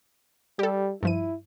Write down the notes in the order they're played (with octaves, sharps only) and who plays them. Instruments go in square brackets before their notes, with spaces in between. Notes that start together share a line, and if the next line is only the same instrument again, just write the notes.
[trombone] G3 [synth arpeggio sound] G4 A4
[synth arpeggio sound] G2 F3 D#7 [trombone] E4